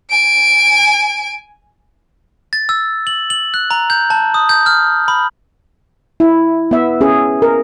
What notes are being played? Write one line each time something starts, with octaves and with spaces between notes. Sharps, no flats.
G#5 D7
A6
E6
F#7
F#7
F#6
A#5
G6
A5
D#6
G6
F6
B5
E4
B3 E5
C#4 G#4
A#4